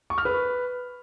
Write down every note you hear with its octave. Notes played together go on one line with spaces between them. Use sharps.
C#6
F6
B4